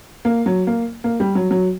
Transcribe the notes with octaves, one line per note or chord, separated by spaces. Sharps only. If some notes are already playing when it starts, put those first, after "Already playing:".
A#3
F#3
A#3
A#3
G3
F#3
F#3